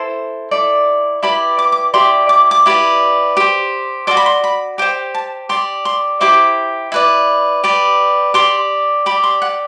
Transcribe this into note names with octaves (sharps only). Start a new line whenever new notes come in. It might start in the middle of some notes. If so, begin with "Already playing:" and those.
Already playing: E4 A4 C5
E4 A4 D5
E4 G4 B4 D5 B5
D6
D6
E4 G4 D5 C6
D6
D6
E4 G4 B4 D5
G4 C5
F#4 A4 D5 C6
B5
C6
B5
G4 C5 G5
A5
G4 D5 C6
C6
E4 G4 C5 D6
E4 B4 D5
G4 B4 D5
G4 D5 C6
G4 D5 B5
C6
F#5